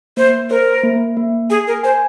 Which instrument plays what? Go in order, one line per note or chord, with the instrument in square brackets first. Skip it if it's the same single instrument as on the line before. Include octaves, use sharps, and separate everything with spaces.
[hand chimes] A#3 [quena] C5
[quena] A#4 [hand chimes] C5
[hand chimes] A#3
A#3
[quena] G#4 [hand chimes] G#5
[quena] A#4
[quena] C5 [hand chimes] G#5